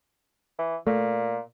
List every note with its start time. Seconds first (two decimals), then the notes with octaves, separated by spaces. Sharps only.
0.59 E3
0.87 A#2 A3